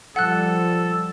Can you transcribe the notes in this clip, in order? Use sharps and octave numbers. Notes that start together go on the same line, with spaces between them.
F3 G3 A4 F#5 F#6